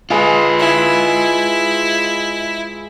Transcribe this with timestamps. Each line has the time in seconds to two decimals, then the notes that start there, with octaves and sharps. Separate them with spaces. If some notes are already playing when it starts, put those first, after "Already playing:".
0.10 G#3 F4 B4
0.59 E4